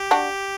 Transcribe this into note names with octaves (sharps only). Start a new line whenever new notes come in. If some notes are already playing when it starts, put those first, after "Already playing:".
Already playing: G4
D4 F#4